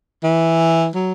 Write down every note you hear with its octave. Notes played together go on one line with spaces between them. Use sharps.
E3
F#3